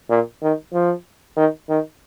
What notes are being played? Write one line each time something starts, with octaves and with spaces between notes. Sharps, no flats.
A#2
D#3
F3
D#3
D#3